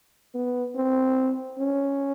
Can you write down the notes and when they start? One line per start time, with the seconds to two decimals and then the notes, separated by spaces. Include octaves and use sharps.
0.35 B3
0.75 C4
1.59 C#4